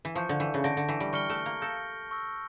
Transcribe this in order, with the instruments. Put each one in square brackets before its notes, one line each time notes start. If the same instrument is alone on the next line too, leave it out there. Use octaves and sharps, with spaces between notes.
[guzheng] E3
[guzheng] F3 [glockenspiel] A5 C#6 G6 C#7
[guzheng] D3
E3
C#3
[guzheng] D3 [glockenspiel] A5 C#6 G6 A#6 D7
[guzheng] D3
E3
G3
[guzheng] G3 [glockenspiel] C#6 F6 C#7 G7
[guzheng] A3
A#3
[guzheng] A4 [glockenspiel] C#6 G6 A#6
[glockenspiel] C#6 E6 A#6